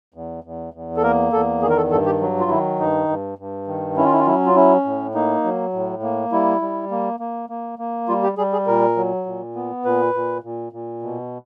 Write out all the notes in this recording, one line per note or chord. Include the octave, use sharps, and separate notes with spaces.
E2
E2
E2
A4
A#3 A#4
E2 A4
D#3 G#4
A#4
A4
G2 A4
G4
F#3
F4
D#3 E4
G2 D#4
G2
G2
D#3
C#4 E4
F4
E4
F4
F#3 E4
F4
C#4 E4
A2
A#3 D#4
F#3
A2
A#3
G3 E4
G3
A#3
A#3
A#3
A#3
G3 F4
G4
G3 G#4
G#4
A#2 A#4
F#3
A#2
B3
A#2 B4
A#2
A#2
A#2
B2